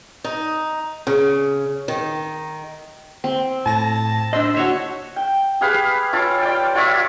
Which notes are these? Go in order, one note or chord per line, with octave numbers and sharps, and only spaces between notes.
D#4
C#3
D#3
C4
A2 A5 A#6
D4 C5 D#5 C6 E6
F#4 C#5 E5
G5
G4 G#4 B4 F5
C#4 F4 A4 D6
D5 F5 G5
F4 C#5 D5 E5